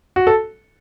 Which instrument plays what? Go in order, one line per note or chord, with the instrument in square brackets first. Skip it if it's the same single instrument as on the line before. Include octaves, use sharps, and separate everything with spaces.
[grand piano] F#4
A4